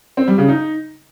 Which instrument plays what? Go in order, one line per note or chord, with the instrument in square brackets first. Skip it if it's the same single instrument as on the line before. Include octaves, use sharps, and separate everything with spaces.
[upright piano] C4
G3
C#3
D#4